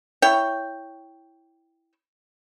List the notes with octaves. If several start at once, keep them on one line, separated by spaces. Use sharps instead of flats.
E4 C#5 G5